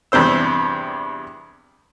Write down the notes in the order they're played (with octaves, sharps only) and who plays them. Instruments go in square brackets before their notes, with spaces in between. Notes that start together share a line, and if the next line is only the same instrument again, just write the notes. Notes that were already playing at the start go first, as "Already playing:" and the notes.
[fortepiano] E2 G2 C3 C5 E6